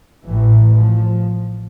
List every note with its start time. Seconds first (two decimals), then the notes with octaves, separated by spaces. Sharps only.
0.24 A1 A2 E3
0.74 F3